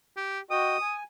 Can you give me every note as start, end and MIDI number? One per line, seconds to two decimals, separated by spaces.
0.17 0.40 67
0.51 0.77 66
0.51 0.77 75
0.51 0.77 79
0.51 0.95 87
0.81 1.03 80